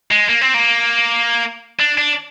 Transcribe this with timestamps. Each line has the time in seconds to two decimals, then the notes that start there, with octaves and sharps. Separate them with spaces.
0.11 G#3
0.29 A#3
0.41 C4
0.54 A#3
1.80 D4
1.98 D4